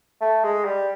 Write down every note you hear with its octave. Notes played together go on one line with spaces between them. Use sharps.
A3
G#3
G3